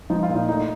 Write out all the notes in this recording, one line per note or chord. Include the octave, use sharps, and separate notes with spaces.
F3 D#4
F4
A#2
D#4
A3 D#4